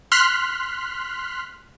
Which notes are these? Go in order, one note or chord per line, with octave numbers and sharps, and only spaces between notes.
C6 F6 F#6 B6